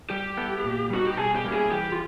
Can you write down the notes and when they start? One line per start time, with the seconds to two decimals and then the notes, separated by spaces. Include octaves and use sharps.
0.10 G3 G4
0.37 B3 E4 A4
0.64 A#2
0.90 G3 B3 D#4 F#4
1.06 G4
1.17 B2 G#4
1.35 G4
1.45 G3 A#3 C#4 E4
1.54 G#4
1.72 E3 G4
1.92 F4